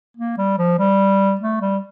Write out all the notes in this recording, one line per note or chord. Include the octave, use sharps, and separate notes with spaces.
A#3
G3
F3
G3
A3
G3